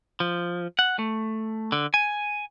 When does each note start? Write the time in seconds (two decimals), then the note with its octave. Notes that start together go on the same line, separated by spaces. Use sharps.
0.20 F3
0.79 F#5
0.99 A3
1.72 D3
1.94 G#5